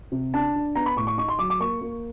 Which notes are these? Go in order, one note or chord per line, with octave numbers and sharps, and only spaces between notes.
C3
D4 A5
D4
B3 A#5
B5
A2 C#6
C#6
D#4 C#6
C6
F#3 D6
D6
A#3 C#6
A#3